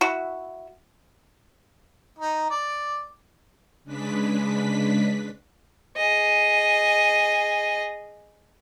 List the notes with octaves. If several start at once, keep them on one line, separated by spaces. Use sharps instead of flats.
E4 F#4
D#4
D5
C#3 G#3 D4 B4 B6
G#4 D#5